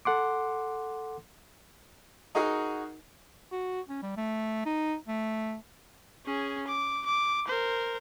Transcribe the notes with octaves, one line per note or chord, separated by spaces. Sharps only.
A4 F#5 C6 D6
D#4 F#4 G#4 A#4 D#5 F#5
F#4
C#4
G3
A3
D#4
A3
C#4 G#4
D6
D6
A#4 C5